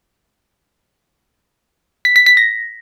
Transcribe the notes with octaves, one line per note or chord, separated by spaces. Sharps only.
B6
B6
B6
A#6